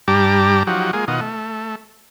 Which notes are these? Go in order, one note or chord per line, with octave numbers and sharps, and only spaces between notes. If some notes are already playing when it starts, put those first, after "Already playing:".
G2 G3 G4 A5 A#5 D6
F3 F#3 D#4 F#4 G4
G#3 A#3 F4 G#4
B2 D#3 F4 F#4 D#5
A3